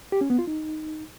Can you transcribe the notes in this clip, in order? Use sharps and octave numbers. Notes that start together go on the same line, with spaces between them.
G4
C#4
B3
F4
D#4